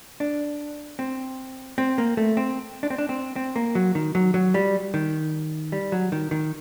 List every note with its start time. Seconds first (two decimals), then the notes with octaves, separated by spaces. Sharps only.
0.20 D4
0.99 C4
1.78 C4
1.98 A#3
2.17 A3
2.37 C4
2.83 D4
2.90 C4
2.98 D4
3.09 C4
3.36 C4
3.56 A#3
3.75 F#3
3.95 D#3
4.15 F#3
4.34 F#3
4.54 G3
4.94 D#3
5.72 G3
5.92 F#3
6.12 D#3
6.31 D#3